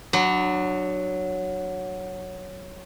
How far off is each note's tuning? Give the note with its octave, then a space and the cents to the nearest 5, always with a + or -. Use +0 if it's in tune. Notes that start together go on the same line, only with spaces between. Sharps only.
F#3 +0 D4 +30 B5 +25